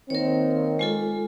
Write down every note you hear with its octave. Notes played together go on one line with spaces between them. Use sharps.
D#3 A#3 C4 A#4 C#5
G#3 F4 A4